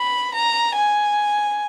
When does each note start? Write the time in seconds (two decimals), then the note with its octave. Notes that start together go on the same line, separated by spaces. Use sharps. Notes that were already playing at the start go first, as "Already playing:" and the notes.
Already playing: B5
0.34 A#5
0.76 G#5